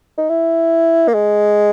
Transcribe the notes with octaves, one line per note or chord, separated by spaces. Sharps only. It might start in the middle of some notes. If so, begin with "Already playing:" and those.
D#4
E4
A#3
G#3